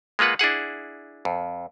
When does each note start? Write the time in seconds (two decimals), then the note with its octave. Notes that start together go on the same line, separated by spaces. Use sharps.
0.19 G#3 A#3 F4 B4 F#5
0.39 D4 E4 G#4 F#5
1.25 F2